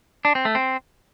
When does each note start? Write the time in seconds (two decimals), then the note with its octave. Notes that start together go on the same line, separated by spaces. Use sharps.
0.25 D4
0.35 C4
0.45 A3
0.55 C4